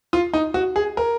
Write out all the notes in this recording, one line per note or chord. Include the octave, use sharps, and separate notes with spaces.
F4
D#4
F#4
G#4
A#4